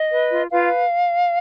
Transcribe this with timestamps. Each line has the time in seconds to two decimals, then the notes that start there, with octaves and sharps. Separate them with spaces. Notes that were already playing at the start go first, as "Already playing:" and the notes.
Already playing: D#5
0.10 B4
0.30 F4
0.50 F4 B4 F5